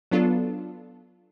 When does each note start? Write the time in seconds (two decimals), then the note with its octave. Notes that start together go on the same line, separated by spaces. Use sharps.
0.11 F#3 B3 D4 F4 A4